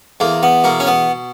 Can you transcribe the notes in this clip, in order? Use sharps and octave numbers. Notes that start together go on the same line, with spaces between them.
E2 A#3
B3
B2 A#3
C#4
B3